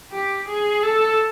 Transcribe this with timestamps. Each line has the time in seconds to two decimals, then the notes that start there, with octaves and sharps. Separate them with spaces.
0.12 G4
0.48 G#4
0.83 A4